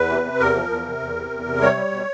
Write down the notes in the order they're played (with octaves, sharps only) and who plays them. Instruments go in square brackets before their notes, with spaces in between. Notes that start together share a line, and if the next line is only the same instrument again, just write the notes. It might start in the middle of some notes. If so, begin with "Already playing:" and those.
Already playing: [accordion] E2 B4
C3
C3
E2 A#4
F3
E2
C3
E2
C3
E2
C3
G3 C#5
G3
B2